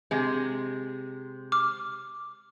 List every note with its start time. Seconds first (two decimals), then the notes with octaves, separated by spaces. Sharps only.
0.11 C3 G#3
1.52 D6 F6